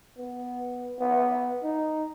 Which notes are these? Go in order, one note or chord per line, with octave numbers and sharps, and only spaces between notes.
B3
B3
D#4